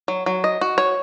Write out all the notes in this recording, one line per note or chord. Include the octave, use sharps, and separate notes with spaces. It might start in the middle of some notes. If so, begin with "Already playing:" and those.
F#3
F#3
D#5
F#4
C#5